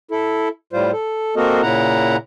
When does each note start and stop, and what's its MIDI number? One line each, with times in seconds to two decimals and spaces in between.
0.11 0.48 64
0.11 0.48 69
0.73 0.91 45
0.73 0.91 55
0.73 0.91 65
0.73 0.91 72
0.92 1.36 69
1.36 1.62 58
1.36 1.62 60
1.36 1.62 66
1.36 1.62 69
1.36 1.62 70
1.36 1.62 75
1.63 2.16 46
1.63 2.16 49
1.63 2.16 64
1.63 2.16 78
1.63 2.16 82